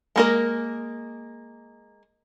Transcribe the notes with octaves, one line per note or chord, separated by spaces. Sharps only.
G#3 A#3 A#4